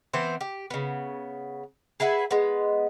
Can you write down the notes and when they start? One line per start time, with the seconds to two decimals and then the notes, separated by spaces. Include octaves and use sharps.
0.14 E3 B3 C4 C5
0.41 G4
0.71 C#3 B3
2.00 G#4 B4 E5 F#5
2.31 G#3 B3